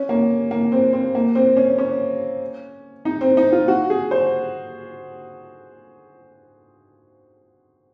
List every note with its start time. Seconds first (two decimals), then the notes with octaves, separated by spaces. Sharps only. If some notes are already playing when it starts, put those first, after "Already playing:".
Already playing: C#4
0.09 A#3
0.51 A#3
0.72 C4
0.93 C4
1.15 A#3
1.35 C4
1.57 C#4
1.78 C#4
3.05 D#4
3.21 C4
3.37 D#4
3.52 F4
3.68 F#4
3.90 G#4
4.11 C5